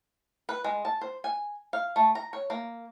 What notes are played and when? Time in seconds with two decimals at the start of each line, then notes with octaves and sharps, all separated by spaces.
0.49 B4
0.64 G#3
0.85 A5
1.01 C5
1.24 G#5
1.73 F5
1.96 A3
2.15 A#5
2.33 C#5
2.50 A#3